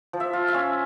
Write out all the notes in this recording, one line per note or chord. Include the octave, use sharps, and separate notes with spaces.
F3
E5
F4
E5
C#4